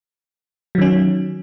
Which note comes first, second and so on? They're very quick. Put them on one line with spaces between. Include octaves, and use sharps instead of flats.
F#3 D#3 C#4